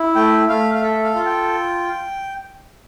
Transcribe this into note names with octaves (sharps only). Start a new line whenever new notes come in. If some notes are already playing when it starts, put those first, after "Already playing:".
Already playing: E4
A3 G5
A3 F5
F5
A4 E5
F5
F4
G5